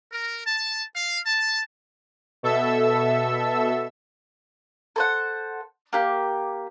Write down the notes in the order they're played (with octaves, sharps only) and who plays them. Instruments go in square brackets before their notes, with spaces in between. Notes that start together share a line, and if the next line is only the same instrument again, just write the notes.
[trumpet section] A#4
A5
F5
A5
[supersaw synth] B2 A4 E5 E6
[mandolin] A4 C5 F#5
A#3 G4